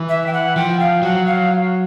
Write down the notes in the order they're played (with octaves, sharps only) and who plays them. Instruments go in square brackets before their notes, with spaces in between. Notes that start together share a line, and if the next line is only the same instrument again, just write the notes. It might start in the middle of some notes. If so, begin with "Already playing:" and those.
Already playing: [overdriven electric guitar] E3
[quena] E5
G5
F#5
[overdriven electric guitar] F3 [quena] G5
[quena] F5
[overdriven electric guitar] F#3 [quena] F#5
[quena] F5